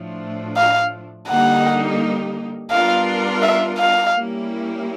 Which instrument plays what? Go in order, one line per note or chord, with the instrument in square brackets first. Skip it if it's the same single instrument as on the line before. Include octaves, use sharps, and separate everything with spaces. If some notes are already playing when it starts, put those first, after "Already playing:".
Already playing: [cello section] A2 F3 A3 D4
[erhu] F5
[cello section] D3 G3 A#3 D#4 G4 [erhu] F#5
[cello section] G3 B3 D4 F4 A#4 [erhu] F5
[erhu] E5
F5
[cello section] G3 A#3 C#4 E4 G4